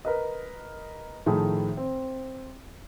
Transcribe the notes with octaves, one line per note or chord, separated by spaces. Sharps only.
A#4 B4 D#5
A2 D#3 F3 A3 G#4
C4